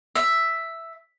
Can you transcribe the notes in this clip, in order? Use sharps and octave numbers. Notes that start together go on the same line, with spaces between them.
E5